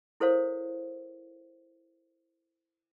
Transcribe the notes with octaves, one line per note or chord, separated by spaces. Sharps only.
E4 A4 A#4 C5 C#5 F5